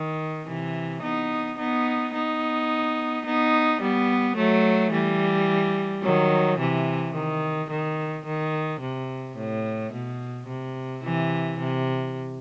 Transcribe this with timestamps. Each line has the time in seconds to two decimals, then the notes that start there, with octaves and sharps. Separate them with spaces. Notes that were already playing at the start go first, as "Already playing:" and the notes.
Already playing: D#3
0.47 C3 E3
1.02 B3 D#4
1.58 B3 D#4
2.14 B3 D#4
3.25 B3 D#4
3.81 G3 B3
4.36 F#3 A3
4.92 E3 G3
6.03 D#3 F#3
6.59 C3 E3
7.15 D#3
7.71 D#3
8.26 D#3
8.81 C3
9.37 A2
9.93 B2
10.48 C3
11.03 C3 E3
11.59 C3